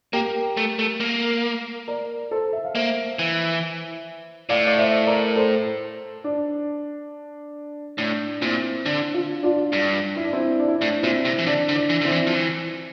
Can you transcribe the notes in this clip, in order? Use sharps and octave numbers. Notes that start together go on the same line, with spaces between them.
A#3 G4 A#4
A3
A3
A#3
A#4 D5
A4 C5
E5
F5
A#3 C5 E5
E3
A2 D5 F5
D5
C5 E5
A#4 D5
A4 C5
D4
A2 D4
A#2 C4 E4
D3 D4
D4 F4
D4 F4
G2 D4
E4
D4
C4 E4
D4
E4
A2 D4
A#2 C4 E4
C3
E3
D3 D4
D3
D4
E3
D3 C4 E4
E3
F3
E3